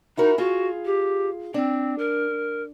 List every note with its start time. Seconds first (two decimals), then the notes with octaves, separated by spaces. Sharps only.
0.17 D#4 E4 F#4 A#4
0.38 F4 F#4 G#4
0.85 G4
1.54 C4 D4
1.98 A#4